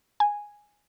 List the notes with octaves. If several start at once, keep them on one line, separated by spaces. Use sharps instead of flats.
G#5